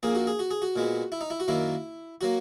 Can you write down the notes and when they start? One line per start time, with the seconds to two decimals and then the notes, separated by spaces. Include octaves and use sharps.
0.03 A#1 A#2 A#3 G#4
0.15 F#4
0.27 G#4
0.39 F#4
0.51 G#4
0.62 F#4
0.76 A#2 G#3 B3
1.12 E4
1.21 D#4
1.30 E4
1.40 F#4
1.48 F#2 D#3 A#3 E4
2.21 F#3 A#3 F#4